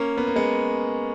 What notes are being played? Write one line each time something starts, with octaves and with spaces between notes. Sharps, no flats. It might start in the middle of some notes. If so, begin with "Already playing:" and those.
Already playing: A#3 C#4
B3
A#3
G#3 B3